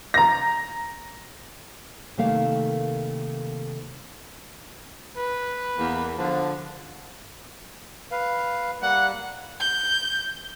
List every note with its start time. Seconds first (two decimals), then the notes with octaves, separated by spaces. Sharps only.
0.14 A#5 A#6
2.17 C3 D#3 A3 A#3 F5
5.17 B4
5.77 E2 A#3
6.18 D3 F3
8.11 B4 F5
8.81 G3 A#3 F#5
9.60 G6